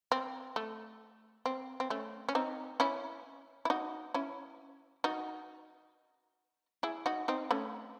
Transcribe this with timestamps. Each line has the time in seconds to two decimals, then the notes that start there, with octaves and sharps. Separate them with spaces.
0.12 C4
0.56 A3
1.46 C4
1.80 C4
1.90 A3 C#4
2.29 C#4
2.35 C4 D#4
2.80 C#4 E4
3.65 E4
3.70 D#4 F#4
4.14 C#4 E4
5.04 D#4 F#4
6.83 E4 G#4
7.06 D#4 F#4
7.28 C4 D#4
7.51 A3 C#4